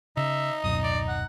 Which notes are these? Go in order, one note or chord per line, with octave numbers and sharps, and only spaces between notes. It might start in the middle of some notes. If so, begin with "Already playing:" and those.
C#3 D#4 E5
D1 F#2 B2 D#6
D5
F#5